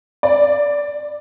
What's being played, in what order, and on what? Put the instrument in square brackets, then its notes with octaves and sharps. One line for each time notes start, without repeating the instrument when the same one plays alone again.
[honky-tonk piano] D5